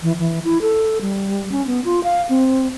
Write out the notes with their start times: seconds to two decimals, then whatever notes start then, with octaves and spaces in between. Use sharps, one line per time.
0.03 E3
0.19 E3
0.45 E4
0.62 A4
1.01 G3
1.52 C#4
1.67 B3
1.85 F4
2.04 F5
2.29 C4